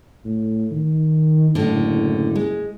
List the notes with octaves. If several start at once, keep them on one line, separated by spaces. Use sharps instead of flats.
A2
D#3
F#1 A2 D3
G#3